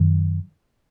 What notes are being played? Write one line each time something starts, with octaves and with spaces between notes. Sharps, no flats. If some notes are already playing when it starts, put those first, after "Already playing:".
Already playing: F#2 D#3